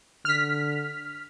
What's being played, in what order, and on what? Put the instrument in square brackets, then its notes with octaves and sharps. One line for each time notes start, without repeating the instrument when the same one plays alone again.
[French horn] D3 [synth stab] F6 B6